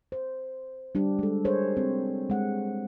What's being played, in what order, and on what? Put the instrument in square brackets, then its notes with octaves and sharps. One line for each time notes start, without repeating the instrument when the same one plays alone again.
[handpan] C5
G3 D4 G4
G#3 A4
G#4 A#4 C5 C#5
C4
G#3 F#5